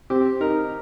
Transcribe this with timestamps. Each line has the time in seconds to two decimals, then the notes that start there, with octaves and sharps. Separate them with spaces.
0.10 C4 G4
0.41 D#4 A#4